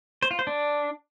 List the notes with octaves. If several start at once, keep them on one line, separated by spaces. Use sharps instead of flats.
C5
F4
C5
D4